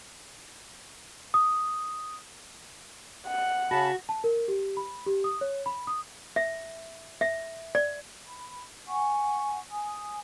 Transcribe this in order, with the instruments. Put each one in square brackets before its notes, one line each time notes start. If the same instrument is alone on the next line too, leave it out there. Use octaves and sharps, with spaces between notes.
[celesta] D#6
[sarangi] F#5
[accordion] C#3 A5 B5 [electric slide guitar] F#4
[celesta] A5
A#4
G4
B5
G4
D#6
C#5
B5
D#6
[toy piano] E5
E5
D5
[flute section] B5
F#5 G#5 C#6
G#5 D#6